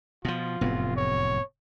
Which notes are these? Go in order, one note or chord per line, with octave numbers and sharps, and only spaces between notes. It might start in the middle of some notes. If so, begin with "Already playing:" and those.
B2 F3 F4
F1 F#2 A2 B3 C4
C#5